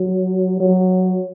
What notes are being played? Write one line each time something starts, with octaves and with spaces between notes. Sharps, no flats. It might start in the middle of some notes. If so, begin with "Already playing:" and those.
Already playing: F#3
F#3